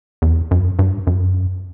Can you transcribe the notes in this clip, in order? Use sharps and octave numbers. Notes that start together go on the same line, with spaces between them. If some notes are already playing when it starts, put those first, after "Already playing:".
E2
F#2
G2
F#2